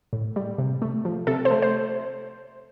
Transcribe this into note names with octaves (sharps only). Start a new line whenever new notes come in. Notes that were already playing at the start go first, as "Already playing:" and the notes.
A2
G3
C3
A3
F3
C3 A4
C5
A3
C5